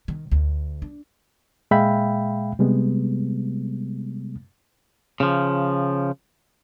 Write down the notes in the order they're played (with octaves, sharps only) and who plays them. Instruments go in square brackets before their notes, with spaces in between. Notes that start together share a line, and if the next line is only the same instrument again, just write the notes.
[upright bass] D#3
D2
D4
[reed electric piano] A#2 G#3 E5 F5 G5 B5
C3 G3 G#3 B3
[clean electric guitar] C#3 F3